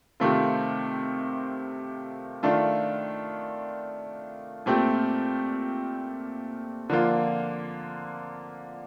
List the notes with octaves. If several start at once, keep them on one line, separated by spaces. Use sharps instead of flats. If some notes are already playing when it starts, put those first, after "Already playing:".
C3 D#3 A3 C4 F4
D#3 A3 D4 F4
A#2 A3 C4 G4
D3 F3 A#3 F4